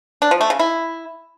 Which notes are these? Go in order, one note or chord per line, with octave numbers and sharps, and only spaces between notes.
D4
F3
A3
C#3
E4